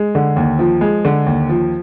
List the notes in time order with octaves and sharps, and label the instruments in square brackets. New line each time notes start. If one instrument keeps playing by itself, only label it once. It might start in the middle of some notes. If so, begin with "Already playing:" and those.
Already playing: [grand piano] G#3
D3
D#2
F3
G#3
D3
D#2
F3